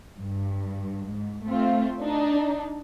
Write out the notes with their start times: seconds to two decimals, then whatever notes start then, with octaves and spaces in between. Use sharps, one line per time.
0.18 G2
1.08 G#2
1.46 A3 C4 F4
2.03 D4 D#4